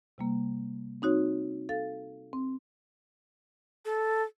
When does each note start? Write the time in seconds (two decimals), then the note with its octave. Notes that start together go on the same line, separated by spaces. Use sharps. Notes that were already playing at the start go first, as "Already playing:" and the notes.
0.18 C3 G3 A#3
1.02 C4 D#4 F#4 C#5
1.69 A4 F5 A6
2.33 C4
3.85 A4